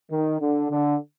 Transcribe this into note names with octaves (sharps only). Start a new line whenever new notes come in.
D#3
D3
D3